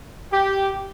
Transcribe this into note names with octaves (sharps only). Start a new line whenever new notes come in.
G4